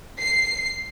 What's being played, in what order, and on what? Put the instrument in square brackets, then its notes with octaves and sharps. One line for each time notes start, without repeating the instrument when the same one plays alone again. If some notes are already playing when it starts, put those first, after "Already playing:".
[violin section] C7